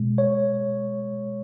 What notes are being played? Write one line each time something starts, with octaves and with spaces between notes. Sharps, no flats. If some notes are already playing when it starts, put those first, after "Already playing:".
Already playing: B2 G#3
C#5